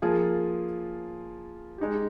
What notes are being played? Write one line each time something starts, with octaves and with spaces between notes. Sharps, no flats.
F3 A#3 F4 G#4
G#3 D#4 G4